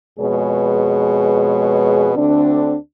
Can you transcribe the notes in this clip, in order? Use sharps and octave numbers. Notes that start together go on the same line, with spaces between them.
F2 B2 G#3 G#4 B4 C#5
D2 D3 C4 D4